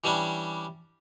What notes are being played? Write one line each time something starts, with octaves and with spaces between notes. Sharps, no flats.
E3 G3 C#4 D4